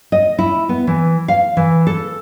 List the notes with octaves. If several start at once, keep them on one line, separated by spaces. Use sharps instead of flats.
D#5
E4
B3
E3
F5
E3
A4